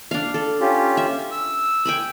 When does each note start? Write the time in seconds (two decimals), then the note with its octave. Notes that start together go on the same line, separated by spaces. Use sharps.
0.11 D4 F5
0.34 A4
0.61 C#4 F4 G4
0.97 E5
1.31 E6
1.85 G5 G#5 B5